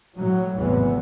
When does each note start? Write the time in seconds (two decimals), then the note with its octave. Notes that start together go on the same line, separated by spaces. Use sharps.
0.16 A2 F#3
0.55 G#1 E2 A2 C3 E3 B3